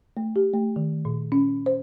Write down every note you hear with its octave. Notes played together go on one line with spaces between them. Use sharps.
A3
G4
A3
D#3
A#2
C#4
C5